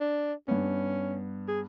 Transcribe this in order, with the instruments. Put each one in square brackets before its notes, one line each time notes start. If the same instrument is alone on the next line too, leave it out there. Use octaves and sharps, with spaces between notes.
[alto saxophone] D4
[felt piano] G2 B3 [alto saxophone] C#4
[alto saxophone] G#4